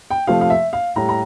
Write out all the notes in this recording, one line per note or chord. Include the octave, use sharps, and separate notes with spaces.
G5
C3 F3 A3 F5
F5
E5
F5
A2 G3 A#5
A#5